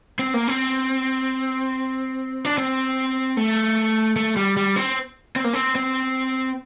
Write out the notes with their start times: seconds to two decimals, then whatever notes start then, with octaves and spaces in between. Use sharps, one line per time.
0.19 C4
0.34 A#3
0.48 C4
2.45 D4
2.58 C4
3.37 A3
4.16 A3
4.36 G3
4.57 G3
4.76 C4
5.36 C4
5.44 A#3
5.53 C4
5.75 C4